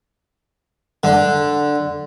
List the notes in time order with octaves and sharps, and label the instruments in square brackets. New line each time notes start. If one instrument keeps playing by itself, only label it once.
[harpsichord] D3